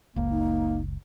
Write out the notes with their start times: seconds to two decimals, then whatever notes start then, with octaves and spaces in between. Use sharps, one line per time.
0.16 F#1 C#2 A#3
0.30 D#4